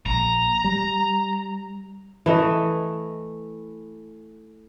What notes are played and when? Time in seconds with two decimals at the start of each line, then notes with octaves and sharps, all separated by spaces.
0.06 A#1 A#5
0.64 G3
2.26 E3 A3 D#5